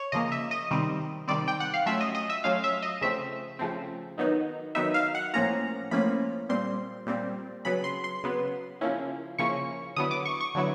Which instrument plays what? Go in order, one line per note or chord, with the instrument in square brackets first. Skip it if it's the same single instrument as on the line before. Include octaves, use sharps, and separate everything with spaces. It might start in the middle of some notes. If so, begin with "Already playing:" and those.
Already playing: [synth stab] C#5
C#3 F3 A#3 D#5
E5
D#5
C3 D#3 G3 C4
C3 D#3 G3 C4 D5
G5
F#5
F5
F#3 A3 C#4 F4 E5
D#5
D#5
E5
F#3 A3 C#4 F4 F5
E5
D#5
C#3 F3 A3 C4 E5
C#3 F3 A3 C4
D#3 F#3 B3 D#4
D#3 F#3 B3 D#4 E5
F5
F#5
A2 F3 A#3 C#4 F4 A#5
A2 F3 A#3 C#4 F4 B5
A#2 G3 C4 C6
A#2 G3 C4
C#3 F#3 B3 B5
C6
C6
C#3 F#3 B3
C#3 F3 A#3 C#4 E4
C#3 F3 A#3 C#4 E4 C#6
D3 F#3 B3 E4 D#6
D6
C#6
C#6
D3 F#3 B3 E4